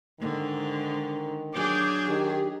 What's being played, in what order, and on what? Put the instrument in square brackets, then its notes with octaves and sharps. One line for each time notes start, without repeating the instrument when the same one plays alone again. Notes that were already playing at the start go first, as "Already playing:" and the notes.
[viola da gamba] G#2 D3 [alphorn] D#3
[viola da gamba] F#3 D4 G#4 [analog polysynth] D6 G6
[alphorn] D#3 [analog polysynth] G4